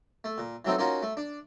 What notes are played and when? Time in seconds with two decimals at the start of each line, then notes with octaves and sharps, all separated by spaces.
0.24 A3
0.38 A#2
0.65 E3 F#3 A3 C4 D#4
0.79 A#3 C#4 D#4 F4 F#4
1.02 A3
1.17 D4